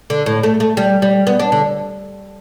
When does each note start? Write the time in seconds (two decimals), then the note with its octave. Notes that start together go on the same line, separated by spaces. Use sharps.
0.10 D3
0.26 A2
0.43 A3
0.60 A3
0.77 G3
1.02 G3
1.27 B3
1.40 D4
1.52 D3